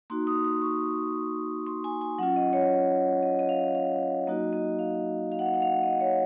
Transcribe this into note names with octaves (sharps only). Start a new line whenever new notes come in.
A#3 D#4 F#4 C6
D#6
D#6
C#6
C6
G#5
G#5
F#3 C#4 F4 F#5
D#5
C#5
D#5
D#5
F5
F5
F#3 A#3 D#4 F#4 D#5
D#5
F5
F5
F#5
F5
F#5
F5
D#5
C#5